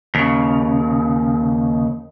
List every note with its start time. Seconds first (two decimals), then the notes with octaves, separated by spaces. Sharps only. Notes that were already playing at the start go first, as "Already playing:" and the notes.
0.15 D#2 C#3